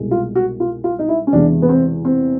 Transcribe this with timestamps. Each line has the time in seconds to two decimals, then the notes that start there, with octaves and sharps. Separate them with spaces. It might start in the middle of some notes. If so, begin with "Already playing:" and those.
Already playing: C2 B2 G#3
0.11 F4
0.35 F#4
0.60 F4
0.84 F4
0.99 D#4
1.08 E4
1.27 C#4
1.32 E1 E2 C3 E3 G#3 D4
1.62 B3
1.69 C4
2.05 C4